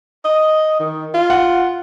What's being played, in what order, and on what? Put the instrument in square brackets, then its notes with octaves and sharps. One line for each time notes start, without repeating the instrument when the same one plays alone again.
[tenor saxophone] D#5
D#3
F4
[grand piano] F#5